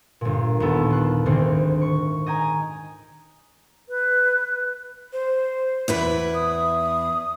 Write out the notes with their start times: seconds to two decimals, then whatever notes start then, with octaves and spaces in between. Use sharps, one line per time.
0.21 G1 A#2
0.60 D#2 A#2 B3 A4
0.90 F4 F#6
1.26 D2 G#2 D3 D#3 C4
1.81 C#6
2.26 D#5 G5 G#5 A#5
3.89 B4
5.13 C5
5.88 E2 E4 B4
6.34 D#6